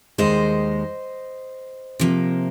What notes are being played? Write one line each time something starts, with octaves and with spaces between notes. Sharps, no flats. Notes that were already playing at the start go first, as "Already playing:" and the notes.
D#2 D#3 G#3 C5 D#5
C3 F3 A#3